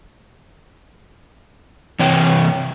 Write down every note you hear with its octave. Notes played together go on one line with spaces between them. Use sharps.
C3 E3 C#5 G5